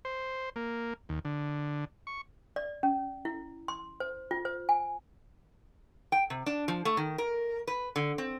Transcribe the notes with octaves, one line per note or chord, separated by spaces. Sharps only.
C5
A#3
D#2
D3
C#6
D5
C#4
E4
C6
C5
F4
C5
G#5
G5
C3
D4
F3
A3
D#3
A#4
B4
D3
C4